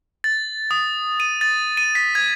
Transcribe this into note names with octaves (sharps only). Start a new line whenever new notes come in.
A6
D#6
D#7
A6
D#7
B6
G#6